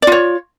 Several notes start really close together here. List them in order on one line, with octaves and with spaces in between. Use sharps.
D5 F4 C#5